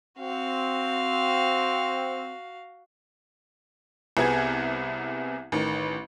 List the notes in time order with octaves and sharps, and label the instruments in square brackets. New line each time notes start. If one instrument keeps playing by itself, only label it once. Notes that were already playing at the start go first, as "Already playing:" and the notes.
[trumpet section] C4 [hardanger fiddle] F#4 F5
[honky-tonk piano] C2 C3 B3 G#4 G#6
A1 D#3